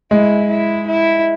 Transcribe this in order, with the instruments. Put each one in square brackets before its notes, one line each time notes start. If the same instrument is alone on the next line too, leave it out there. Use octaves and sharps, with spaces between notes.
[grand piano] G#3 [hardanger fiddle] E4
[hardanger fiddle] E4
E4